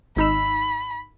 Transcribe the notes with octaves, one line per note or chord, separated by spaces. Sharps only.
G#1 D#4 B5 E6